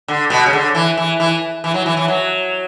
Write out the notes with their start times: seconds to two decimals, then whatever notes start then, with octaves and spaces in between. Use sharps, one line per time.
0.08 D3
0.30 B2
0.46 C#3
0.53 D3
0.75 E3
0.97 E3
1.20 E3
1.64 E3
1.74 F#3
1.86 E3
1.97 E3
2.08 F#3